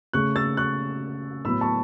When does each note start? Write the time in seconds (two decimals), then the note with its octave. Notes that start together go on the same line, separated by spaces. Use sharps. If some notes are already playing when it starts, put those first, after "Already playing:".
0.13 C#3 A3 C#6 F#6
0.36 E6 A6
0.57 C#6 F#6
1.45 A2 F#3 B3 B5 E6
1.61 A5 C#6